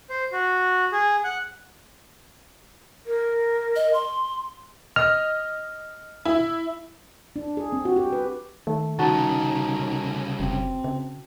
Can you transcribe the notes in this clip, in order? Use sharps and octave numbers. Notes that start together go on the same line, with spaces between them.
C5
F#4
G#4
F#5
A#4
D#5
C6
D#5 F6
E4
D4
G#4
C4
F#4
G4
B4
D#3 A3
C2 C#3 D#4 F#4 A5
F#1 C4
C#3